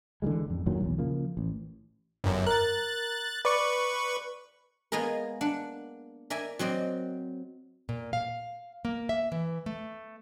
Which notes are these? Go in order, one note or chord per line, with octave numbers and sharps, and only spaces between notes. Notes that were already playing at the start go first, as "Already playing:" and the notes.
D3 E3 G3 G#3
A1 F2
G2 A#2 D#3 F#3
B1 E2
C#3 F3 A#3
A1
G1 F#2
A#4 F#6 A6
B4 D5 C#6
G#3 A#3 B3 G#4 A#4
D4 F#5
A#4 D5 E5 G#5
F#3 C4 D5 D#5
A#2
F5
A#3
E5
E3
A3